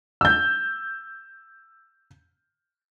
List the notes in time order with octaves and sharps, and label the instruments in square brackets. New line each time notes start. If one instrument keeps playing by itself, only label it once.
[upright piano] E6 G6